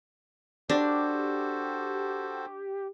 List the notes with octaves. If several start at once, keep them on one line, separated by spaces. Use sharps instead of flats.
D4 F#4 G4 A4 C5